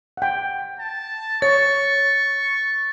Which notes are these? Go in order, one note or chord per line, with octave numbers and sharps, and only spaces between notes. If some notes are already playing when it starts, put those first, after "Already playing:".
F#5 G5
A5
C#5 C#6 A6